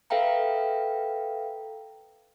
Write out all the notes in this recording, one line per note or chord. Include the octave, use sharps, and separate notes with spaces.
A4 B4 E5 F5 G5 A#5